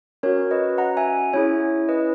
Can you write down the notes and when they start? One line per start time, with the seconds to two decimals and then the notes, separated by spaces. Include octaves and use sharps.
0.23 C#4 F#4 A#4 C#5
0.51 B4 D#5
0.78 F#5 A#5
0.97 E5 G#5
1.33 C#4 E4 G#4 C#5 E5
1.89 B4 D#5